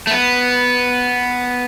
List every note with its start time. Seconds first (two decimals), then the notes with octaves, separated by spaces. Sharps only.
0.07 A3
0.11 B3